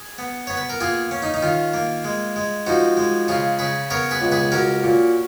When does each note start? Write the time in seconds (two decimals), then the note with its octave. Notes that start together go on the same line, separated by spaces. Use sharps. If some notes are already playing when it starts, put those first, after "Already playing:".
Already playing: G#4
0.18 B3
0.47 B3 C#5
0.57 B4
0.70 A#4
0.81 A#3 F4 G#4
1.11 C#4
1.22 D#4
1.34 D#4
1.42 D#3 F4
1.74 A#3
2.04 G#3
2.36 G#3
2.66 F3 D#4 F#4
2.97 G#3
3.28 C#3 F4 G#4
3.59 C#3 G#4 B4
3.90 B3 A#4 C#5
4.11 G#4 B4
4.21 C#2
4.32 G#4 B4
4.52 C#4 F#4 A#4
4.84 A#2